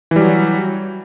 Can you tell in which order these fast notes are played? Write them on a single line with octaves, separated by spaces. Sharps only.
E3 G3 F#3